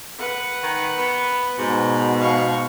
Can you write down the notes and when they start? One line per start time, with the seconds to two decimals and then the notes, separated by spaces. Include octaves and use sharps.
0.19 B4 F#5
0.63 D#3
0.98 B3
1.59 G#2 B2
2.20 F5 C#6